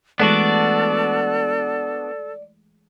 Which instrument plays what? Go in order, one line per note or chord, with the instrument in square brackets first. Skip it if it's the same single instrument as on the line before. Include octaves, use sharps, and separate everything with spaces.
[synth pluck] E3 G#3 A3 [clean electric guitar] B3 D4 F#4 [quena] A4 [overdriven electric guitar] D5